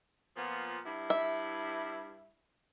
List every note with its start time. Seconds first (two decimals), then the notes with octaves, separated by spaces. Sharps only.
0.36 A#2 F3 B3
0.85 G2 E4
1.10 E5